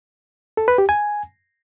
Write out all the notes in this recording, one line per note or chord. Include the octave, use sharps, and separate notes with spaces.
A4
B4
G4
G#5